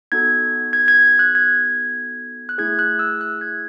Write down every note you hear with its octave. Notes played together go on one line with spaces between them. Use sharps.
B3 D#4 F#4 A4 G#6
G#6
G#6
F#6
G#6
F#6
A3 E4 G#4 G#6
F#6
E6
F#6
G#6